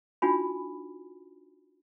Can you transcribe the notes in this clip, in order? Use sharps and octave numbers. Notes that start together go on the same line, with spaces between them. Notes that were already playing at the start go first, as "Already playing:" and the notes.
D4 D#4 F4 F#4 G#5 B5